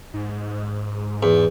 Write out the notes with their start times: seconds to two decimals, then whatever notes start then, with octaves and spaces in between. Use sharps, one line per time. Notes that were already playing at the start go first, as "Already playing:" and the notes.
0.14 G#2
1.23 E2